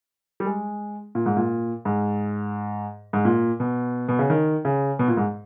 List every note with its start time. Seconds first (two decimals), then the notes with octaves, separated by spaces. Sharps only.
0.40 G3
0.46 G#3
1.15 A#2
1.26 G#2
1.37 A#2
1.85 G#2
3.13 G#2
3.25 A#2
3.60 B2
4.08 B2
4.19 C#3
4.30 D#3
4.65 C#3
4.99 B2
5.08 A#2
5.17 G#2